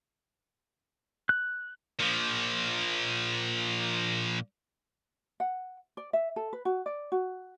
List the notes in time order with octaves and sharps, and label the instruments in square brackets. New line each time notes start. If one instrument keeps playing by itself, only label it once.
[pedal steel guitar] F#6
[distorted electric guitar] A#2 F3
[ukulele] F#5
D5
E5
A4
B4
F#4
D5
F#4